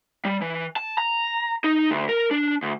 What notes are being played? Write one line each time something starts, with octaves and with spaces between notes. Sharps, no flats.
G3
E3
A5
A#5
D#4
D2
A#4
D4
D2